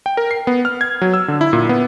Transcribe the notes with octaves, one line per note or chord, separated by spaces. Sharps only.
G5
A#4
C7
B3
F6
G#6
F#3
E6
D3
E4
A#2
B3